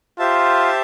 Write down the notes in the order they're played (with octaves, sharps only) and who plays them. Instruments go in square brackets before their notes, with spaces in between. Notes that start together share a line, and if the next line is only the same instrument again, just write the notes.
[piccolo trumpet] F4 [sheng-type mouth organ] G4 C5 E5 A5